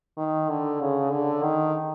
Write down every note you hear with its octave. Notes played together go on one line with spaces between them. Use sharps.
D#3
D3
C#3
D3
D#3